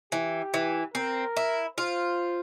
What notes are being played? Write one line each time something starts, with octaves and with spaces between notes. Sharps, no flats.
E3 G4
E3
C4 A#4
E4
F4 C5